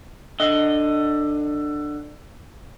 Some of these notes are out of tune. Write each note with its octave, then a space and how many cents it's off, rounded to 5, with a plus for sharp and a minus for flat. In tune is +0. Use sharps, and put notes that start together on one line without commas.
D3 +15 D#5 +0